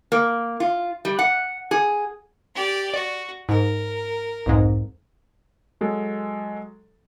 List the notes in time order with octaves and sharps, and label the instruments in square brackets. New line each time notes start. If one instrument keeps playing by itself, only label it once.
[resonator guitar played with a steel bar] A#3
F4
G3
F#5
G#4
[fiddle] G4 D5
[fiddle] F#4 [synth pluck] D5
[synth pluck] G#2 [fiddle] A#4
[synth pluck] B1 F2 G#2
[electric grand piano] F#3 G#3 A4